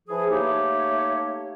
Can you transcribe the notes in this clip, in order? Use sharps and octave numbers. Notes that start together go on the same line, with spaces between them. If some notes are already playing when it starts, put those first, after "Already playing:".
E3 F3 G#4
A3 A#3 D#4 G4 C#5